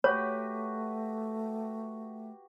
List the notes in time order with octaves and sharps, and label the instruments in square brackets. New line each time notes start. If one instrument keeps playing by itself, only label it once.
[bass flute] A3 [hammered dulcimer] F#4 G4 B4 [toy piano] C#5